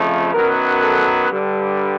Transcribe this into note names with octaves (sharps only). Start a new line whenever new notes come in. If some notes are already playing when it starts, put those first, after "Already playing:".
Already playing: F2 C#3 F3 A3
F#2 D#3 F#3 B3 A#4
A4
G2 D3 G3